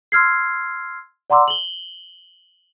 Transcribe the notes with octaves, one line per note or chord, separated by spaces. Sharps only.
C6 E6 F6 G#6 C7
D5 F#5 A#5 C6 D6 E6
F#7 G7